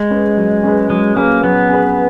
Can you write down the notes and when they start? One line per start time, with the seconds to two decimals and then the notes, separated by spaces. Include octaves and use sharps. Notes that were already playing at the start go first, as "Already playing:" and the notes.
Already playing: G#3
0.10 C#4 G#4 B4
0.37 F#3
0.63 C#4 G#4 B4
0.90 F#3 G#3
1.16 A#3 C#4 G#4 B4
1.43 F#3 B3
1.69 C#4 G#4 B4